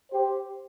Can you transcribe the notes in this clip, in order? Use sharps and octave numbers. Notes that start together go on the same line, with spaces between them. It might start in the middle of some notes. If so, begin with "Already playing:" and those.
G4 C5